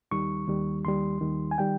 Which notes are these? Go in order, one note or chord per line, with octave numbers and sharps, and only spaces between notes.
D#2 D#3 G3 C#6
D#2 D#3 G3
D#2 D#3 G3 C6
D#2 D#3 G3
G#5
D#3 G3 G5